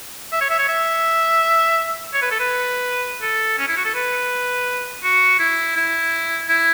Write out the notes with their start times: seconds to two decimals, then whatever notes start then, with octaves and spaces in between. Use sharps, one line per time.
0.32 E5
0.41 C#5
0.50 E5
0.59 C#5
0.68 E5
2.14 C#5
2.22 B4
2.31 A4
2.40 B4
3.22 A4
3.58 C#4
3.68 E4
3.76 F#4
3.85 A4
3.95 B4
5.03 F#4
5.39 E4
5.76 E4
6.49 E4